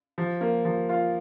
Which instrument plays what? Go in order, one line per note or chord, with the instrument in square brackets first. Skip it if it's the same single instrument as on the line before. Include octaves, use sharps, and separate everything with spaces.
[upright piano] F3
A#3
F3
F4